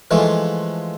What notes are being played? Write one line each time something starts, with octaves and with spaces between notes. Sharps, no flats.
E3 F3 G#3 A3